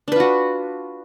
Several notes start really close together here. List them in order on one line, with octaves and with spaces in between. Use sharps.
D4 B4 F4 F#4